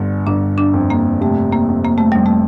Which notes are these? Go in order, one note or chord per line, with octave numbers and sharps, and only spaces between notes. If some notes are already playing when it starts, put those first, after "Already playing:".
Already playing: G1 D3
G1 D4
D4
F2
A#3
C3 A3
A#3
F2
A#3
A3
F2 G3
A3